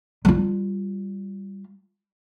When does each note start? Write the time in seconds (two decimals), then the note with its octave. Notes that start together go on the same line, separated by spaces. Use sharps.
0.25 G3 F4